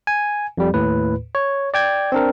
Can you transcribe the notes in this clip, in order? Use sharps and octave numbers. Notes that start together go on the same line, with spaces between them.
G#5
F2 G3
D#2 A2 B4
C#5
D5 G5 G#6
C4 D4 A#4